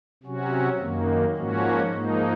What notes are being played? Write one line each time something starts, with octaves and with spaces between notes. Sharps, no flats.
C3 F#3 C#4 F#4
F#2 D#3 A#3
G#2 F3 A#3 C#4 F#4
G#2 F3 A#3 D#4